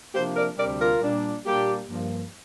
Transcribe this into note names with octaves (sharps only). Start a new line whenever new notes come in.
C3 F3 A#3 D4 G4 C5
A#4 D5
D2 C3 G3 D4 A#4 D5
F4 A#4
A#2 G3 D4
A#2 G3 A#3 D4 G4
G2 F3 A#3